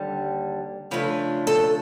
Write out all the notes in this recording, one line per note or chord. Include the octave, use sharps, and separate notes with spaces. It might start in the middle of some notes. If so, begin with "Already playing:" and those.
Already playing: D#2 D3 G3
C#3 F3 A3 D4 B4
A4